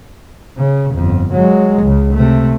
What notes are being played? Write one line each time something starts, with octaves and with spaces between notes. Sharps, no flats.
C#3
G1 F2
F#3 G#3
C#2 C#3
C3 A3